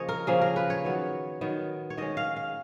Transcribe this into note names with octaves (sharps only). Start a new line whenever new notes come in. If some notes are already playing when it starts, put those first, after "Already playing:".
Already playing: C#3 F3 A#3 C#4 C#5 D#5
A#4
C#3 F3 A#3 C#4 G#4
A#4
B4
C#5
D#3 F#3 B3
D#3 F#3 B3
C#5
D#3 G#3 C#4 D#5
F5
F5